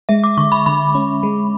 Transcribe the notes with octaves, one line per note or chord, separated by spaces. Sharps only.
G#3 E5
D6
D3 C#6
B5
D3 B5
C#4
G#3